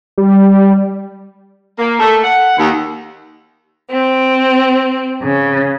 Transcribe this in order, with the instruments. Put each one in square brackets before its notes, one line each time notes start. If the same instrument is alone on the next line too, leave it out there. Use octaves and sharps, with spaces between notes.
[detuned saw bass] G3
[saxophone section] A#3
A3
F#5
D#2
[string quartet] C4
C#3